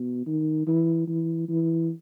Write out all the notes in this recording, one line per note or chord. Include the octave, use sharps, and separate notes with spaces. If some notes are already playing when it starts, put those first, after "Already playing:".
Already playing: B2
D#3
E3
E3
E3